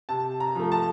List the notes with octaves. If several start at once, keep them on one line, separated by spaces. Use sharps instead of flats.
C3 A5
A#5
F3 A3
A5